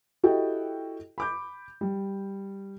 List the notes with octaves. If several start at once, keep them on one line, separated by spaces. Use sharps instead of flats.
E4 F#4 G4 A4 D#5 G5
B5 D6 G6
G3